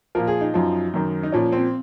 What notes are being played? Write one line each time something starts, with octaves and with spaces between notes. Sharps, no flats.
A#2 F3 A#4
G#4
D#4
F#2 F3
F#2 D#3
D#4
A#2 F3 C#4
C4